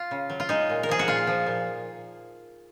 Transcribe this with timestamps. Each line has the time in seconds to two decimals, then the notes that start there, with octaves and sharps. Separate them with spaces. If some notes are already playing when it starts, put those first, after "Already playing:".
Already playing: F4
0.11 C#3
0.30 F#3
0.40 F4
0.49 G#3 D#4
0.70 A#2
0.83 A#4
0.89 F3 G#4
0.99 F#4
1.07 A#2 F4
1.27 F3
1.47 A#2